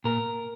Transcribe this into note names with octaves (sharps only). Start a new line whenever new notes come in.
A#2 A#4